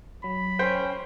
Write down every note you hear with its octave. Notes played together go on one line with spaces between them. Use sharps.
F#3 B5
C#4 C5 G5